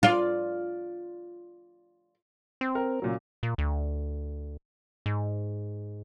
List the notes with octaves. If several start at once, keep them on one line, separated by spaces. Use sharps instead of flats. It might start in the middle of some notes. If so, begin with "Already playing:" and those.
F4 D5
C4
A#4
A#2 C#3 F#3
A#2
D2
G#2